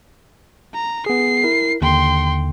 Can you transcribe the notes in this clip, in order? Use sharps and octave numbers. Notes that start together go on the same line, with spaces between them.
A#5
B3 G#4 C7
E4 A#4
D#2 D3 G5 C6